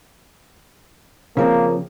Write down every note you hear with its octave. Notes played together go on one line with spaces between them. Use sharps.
C#3 F3 A#3 C4